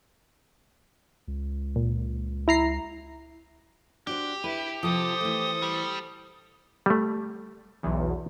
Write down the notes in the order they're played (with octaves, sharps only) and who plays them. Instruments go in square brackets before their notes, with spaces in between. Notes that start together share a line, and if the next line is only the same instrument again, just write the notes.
[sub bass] C#2
[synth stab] A#2
E4 A#5 C7
[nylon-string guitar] D4 F#4 C5 [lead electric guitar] G4
[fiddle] E4 [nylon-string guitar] B4
[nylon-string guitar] C3 F3 [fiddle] A4 C5 [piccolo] D#6
[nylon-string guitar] E3 A3
[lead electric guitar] G3
[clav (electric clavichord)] G3 A3
[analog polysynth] B1 E2